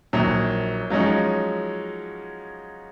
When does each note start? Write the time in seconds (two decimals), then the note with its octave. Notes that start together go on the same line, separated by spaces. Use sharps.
0.13 A#1 D#3 F#3
0.90 F3 F#3 G#3 C#4 D#4